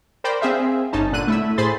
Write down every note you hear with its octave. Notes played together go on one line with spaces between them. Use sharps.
A#4 C5 D5 G5 B5
C4 G#4 E5 F5
G1 C#4 D#4 A5
A#2 D3 F#6 D#7
A3 E4 E5
A2 G#4 C5 B5 C6 A6